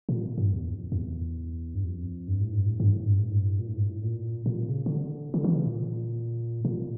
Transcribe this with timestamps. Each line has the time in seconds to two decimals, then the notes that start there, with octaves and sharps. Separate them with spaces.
0.09 A#2
0.38 G2
0.53 E2
0.74 F2
0.92 F2
0.97 E2
1.75 G2
1.84 F2
2.28 G2
2.41 A2
2.53 G2
2.66 A2
2.80 G2
2.92 A2
3.06 G2
3.19 A2
3.32 G2
3.59 A#2
3.67 A2
3.76 G2
3.85 A2
4.03 A#2
4.46 A#2
4.69 C#3
4.86 C#3
4.90 D3
5.34 D3
5.44 E3
5.56 C#3
5.67 A#2
6.65 A#2